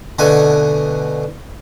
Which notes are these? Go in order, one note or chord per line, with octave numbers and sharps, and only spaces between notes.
B2 D3 A3 G#5